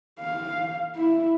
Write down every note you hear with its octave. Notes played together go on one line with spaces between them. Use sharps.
F5
E4